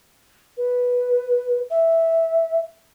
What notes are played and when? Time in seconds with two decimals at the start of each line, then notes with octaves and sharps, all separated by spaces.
0.58 B4
1.71 E5